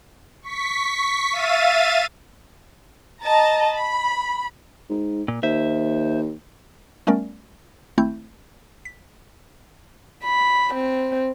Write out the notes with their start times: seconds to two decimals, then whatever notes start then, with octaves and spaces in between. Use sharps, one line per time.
0.42 C#6 B6
1.32 E5 F5 A6 D#7
3.22 D#5 A5 A#5
3.76 B5
4.89 G#2
5.28 A#2
5.43 D#2 C5 E5
7.07 G3 A3 B3 C#4 A#4 D5
7.98 G#1 A3 C4 E4 G6
8.85 B6
10.24 B5
10.74 C4